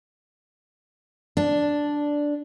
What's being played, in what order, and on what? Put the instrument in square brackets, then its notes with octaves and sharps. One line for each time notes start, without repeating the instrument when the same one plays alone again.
[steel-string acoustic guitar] D4